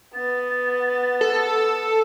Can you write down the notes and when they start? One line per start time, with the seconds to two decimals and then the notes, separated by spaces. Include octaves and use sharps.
0.14 B3 A6
1.21 A4